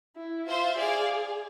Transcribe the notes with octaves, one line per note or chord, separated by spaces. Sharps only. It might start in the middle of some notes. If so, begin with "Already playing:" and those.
E4
F4 C5 E5
G#4 D5 F5